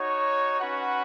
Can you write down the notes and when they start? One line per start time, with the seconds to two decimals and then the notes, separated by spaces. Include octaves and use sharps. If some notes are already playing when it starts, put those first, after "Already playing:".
Already playing: D#4 F#4 C#5
0.59 C#4 F#4 B4 F#5